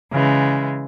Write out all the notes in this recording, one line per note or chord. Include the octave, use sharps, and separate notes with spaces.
C#3 E3 G#3